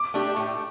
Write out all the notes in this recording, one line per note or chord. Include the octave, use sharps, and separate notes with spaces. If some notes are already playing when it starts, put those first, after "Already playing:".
Already playing: D6
A3 D4 G4
A2